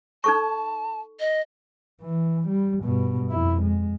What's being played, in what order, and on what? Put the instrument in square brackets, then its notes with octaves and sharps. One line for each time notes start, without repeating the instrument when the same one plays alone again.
[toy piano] D#4 A4 C#6 [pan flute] A5
[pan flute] D#5
[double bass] E3
G3
G2 B2
F2 E4
G#3